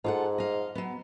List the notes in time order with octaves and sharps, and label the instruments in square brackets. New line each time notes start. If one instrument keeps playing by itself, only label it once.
[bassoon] G#2 [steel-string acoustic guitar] F4 A4 F#5
[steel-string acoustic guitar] D#5 F5
F#3 B3